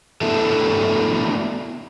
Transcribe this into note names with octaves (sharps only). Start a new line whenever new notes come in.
A3 B3 D4 E4 F#4 A4